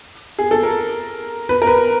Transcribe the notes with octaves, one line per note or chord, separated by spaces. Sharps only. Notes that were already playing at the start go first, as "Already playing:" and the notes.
G#4
A4
A#4
B4
A#4
B4